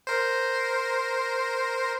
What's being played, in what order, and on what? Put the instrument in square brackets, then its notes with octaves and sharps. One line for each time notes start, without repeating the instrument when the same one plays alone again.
[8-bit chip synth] A#4 C5